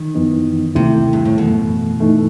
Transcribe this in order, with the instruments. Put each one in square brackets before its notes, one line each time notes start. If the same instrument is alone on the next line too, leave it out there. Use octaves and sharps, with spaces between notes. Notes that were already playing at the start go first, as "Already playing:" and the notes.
Already playing: [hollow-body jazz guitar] D#3
[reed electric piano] F#2 E3 B3 D#4
[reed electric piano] D#2 D#3 A3 E4 [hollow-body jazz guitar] C3
[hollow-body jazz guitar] G2
A2
[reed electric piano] F#2 E3 A3 [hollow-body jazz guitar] B2
[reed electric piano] G2 E3 A3 D#4